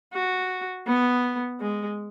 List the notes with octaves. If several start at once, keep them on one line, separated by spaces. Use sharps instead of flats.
F#4
B3
G#3